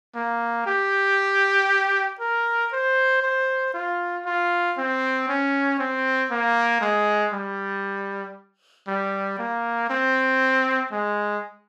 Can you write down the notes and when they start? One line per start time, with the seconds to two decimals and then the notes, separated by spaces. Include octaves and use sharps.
0.15 A#3
0.67 G4
2.20 A#4
2.73 C5
3.23 C5
3.74 F4
4.25 F4
4.78 C4
5.29 C#4
5.79 C4
6.31 A#3
6.81 G#3
7.33 G3
8.87 G3
9.39 A#3
9.90 C4
10.92 G#3